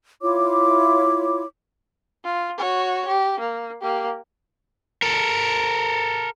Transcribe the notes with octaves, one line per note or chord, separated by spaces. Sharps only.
E4 F4 C#5 D6
F4
F#4 C#5
G4
A#3
A#3 G4
A4 A#4